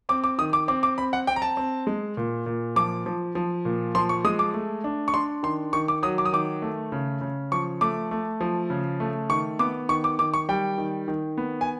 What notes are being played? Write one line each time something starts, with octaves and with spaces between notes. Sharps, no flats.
C4 D6
D6
D#3 D#6
D6
C4 D6
D6
C4 B5
F#5
C4 G5
A#5
A5
C4
G#3
A#2
A#2
F3 D6
F3
F3
A#2
F3 C6
C#6
G#3 D#6
D6
A3
D4
C#6
D4 C6
D#3 C6
D#3 C#6
D6
F#3 D#6
D6
D#6
D#3 D6
A3
C#3
C#3
F3 C#6
A3 D6
A3
F3
C#3
A3
D#3 C#6
B3 D6
D#3 C#6
D6
D#3 D6
C#6
G3 G5
D#3
D#3
B3
G#5